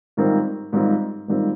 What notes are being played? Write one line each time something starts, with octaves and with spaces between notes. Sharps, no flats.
G#2 D#3 G3 C4 F4
G#2 D#3 G3 C4 F4
G#2 D#3 G3 C4 F4